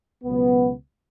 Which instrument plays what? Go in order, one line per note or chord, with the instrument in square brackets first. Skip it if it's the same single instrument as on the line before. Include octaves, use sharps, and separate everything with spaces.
[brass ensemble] C#2 B2 F#3 B3